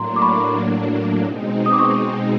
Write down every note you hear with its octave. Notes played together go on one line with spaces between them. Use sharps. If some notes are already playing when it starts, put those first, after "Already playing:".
Already playing: A2 F#3 A#3 D4 A#5 C6
D6
B5 C#6
B2 G#3 C4 D#4
D#6
D6
C#6 D#6